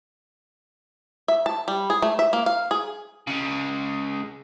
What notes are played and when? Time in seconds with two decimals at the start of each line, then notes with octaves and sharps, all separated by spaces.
1.28 E5
1.46 A5
1.68 G3
1.90 G#4
2.02 A3
2.19 E5
2.33 A#3
2.46 F5
2.71 G#4
3.27 C#3 G#3